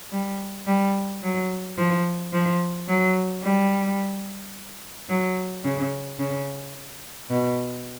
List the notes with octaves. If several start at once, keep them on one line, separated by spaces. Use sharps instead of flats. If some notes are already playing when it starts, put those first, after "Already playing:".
G3
G3
F#3
F3
F3
F#3
G3
F#3
C#3
C#3
B2